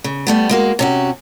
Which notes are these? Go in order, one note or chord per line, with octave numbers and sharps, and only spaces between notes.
C#3
G3 A3 B3
G#3 A#3 F#4
C3 C#4 F#4